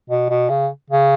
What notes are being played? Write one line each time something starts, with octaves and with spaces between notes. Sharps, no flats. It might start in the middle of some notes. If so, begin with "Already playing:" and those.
B2
B2
C#3
C#3